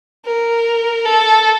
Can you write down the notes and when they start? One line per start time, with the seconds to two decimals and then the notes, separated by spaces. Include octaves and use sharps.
0.26 A#4
1.06 A4